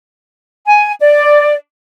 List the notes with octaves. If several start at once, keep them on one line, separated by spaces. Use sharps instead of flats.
G#5
D5